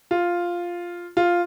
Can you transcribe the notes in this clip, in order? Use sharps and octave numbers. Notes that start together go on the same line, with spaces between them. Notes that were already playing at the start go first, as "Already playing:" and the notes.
F4
F4